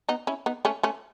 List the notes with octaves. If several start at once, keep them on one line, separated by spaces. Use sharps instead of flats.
B3 D#4
C#4 E4
B3 D#4
A3 C#4
A3 C#4